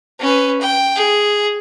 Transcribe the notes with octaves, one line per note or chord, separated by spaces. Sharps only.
C#4 B4
G5
G#4